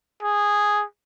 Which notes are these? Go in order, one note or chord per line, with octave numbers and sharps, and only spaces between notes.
G#4